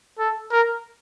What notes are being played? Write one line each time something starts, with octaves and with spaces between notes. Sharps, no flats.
A4
A#4